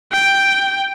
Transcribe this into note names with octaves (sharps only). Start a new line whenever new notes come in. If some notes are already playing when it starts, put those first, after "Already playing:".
G5